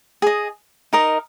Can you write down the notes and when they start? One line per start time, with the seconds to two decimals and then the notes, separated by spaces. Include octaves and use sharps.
0.22 G#4 D#5
0.93 D#4 A#4 D#5